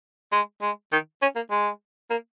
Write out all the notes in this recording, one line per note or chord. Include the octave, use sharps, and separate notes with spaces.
G#3
G#3
D#3
C#4
A#3
G#3
A#3